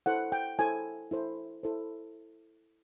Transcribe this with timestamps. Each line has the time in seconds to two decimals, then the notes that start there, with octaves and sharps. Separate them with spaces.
0.06 E4 A4 C5 F#5
0.32 G5
0.59 E4 A4 C5 G#5
1.11 E4 A4 C5
1.63 E4 A4 C5